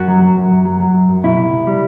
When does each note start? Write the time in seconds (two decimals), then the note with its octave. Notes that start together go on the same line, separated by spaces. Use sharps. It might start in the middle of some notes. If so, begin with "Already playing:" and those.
Already playing: F#2 F#4
0.08 F#3
0.22 F#3
0.37 F#2
0.50 F#2
0.65 F#3
0.80 F#3
0.94 F#2
1.09 F#2
1.24 B2 E4
1.38 C2
1.52 C2
1.67 G3